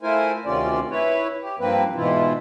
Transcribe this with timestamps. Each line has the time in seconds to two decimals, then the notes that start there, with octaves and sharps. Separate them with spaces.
0.02 A3 E4 F4 A#4 C5 G#5
0.45 D2 C3 D#3 C#4 F4 D5
0.90 E4 B4 C#5
1.41 G4
1.59 G2 F3 A#3 C4 B4
1.95 G#2 B2 E3 E4 F4